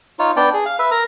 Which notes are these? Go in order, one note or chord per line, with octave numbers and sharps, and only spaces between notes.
D#4 F4 C#5
B3 D4 D5 G5
G#4
F5
B4 E5
A#4 A#5